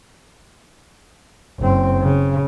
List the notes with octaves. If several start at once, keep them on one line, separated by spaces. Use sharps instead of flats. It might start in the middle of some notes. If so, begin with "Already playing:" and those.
F#1 C4
C#3